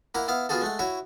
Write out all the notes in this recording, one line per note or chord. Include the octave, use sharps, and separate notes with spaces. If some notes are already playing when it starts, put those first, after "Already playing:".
A#3 E4 F#5 A#5
B3 E4 F5
B3 F4 F#4 G#4 A4
G#3 A3 F#5
E4 F#4 C#5